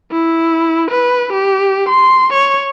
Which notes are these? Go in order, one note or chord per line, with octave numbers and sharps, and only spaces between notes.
E4
B4
G4
C6
C#5